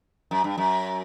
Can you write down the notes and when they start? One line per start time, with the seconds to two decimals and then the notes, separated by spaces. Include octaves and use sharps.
0.31 F#2
0.44 G2
0.58 F#2